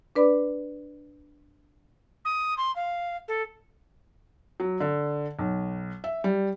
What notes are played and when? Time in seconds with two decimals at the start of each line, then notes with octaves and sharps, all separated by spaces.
0.15 D4 B4 D5 B5 D6
2.25 D#6
2.57 C6
2.76 F5
3.28 A4
4.60 F#3
4.80 D3
5.39 B1
6.04 E5
6.24 G3